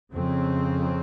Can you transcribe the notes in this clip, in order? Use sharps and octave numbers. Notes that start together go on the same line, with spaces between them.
F2 C#3 C4